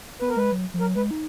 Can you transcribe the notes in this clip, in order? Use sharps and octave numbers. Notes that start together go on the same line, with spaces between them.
B3 B4
A#4
G#3 B4
F#3
F3
F#3 A#4
G#3 B4
D#4